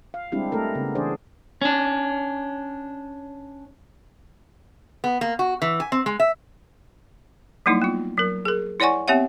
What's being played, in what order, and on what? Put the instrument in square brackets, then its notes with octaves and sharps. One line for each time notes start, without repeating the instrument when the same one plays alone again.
[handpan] F5
G3 G#3 C4 D4 E4 G4
A3 A4 A#4
C#3 B3
E3 D4 G#4 C5 D5
[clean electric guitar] C#4 D4
[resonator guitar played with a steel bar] B3
A#3
F#4
E3
G#5
C4
G#3
E5
[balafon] F#3 G3 A#3 D#4 E4
B3 F4
F#3 A#4
G#4 A#4
E4 C#5 D5 F#5 G#5 C#6
B3 C4 G4 C#5 E5 F#5